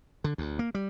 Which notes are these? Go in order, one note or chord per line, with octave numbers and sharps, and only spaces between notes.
D3
D2
A#3
G3